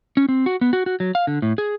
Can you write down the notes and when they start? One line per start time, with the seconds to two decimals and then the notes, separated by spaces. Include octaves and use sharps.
0.17 C#4
0.29 C4
0.46 F#4
0.61 B3
0.73 F#4
0.86 F#4
1.00 F#3
1.15 F5
1.27 D3
1.42 A2
1.58 G#4